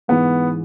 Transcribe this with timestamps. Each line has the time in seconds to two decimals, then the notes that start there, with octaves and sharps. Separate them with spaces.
0.08 G#2 E3 B3